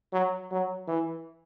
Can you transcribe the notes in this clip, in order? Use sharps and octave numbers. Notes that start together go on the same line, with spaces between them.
F#3
F#3
E3